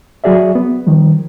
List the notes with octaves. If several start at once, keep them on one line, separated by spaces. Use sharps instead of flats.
F#3 F#4 G#4 D5 E5
B3
D#3 F3 G3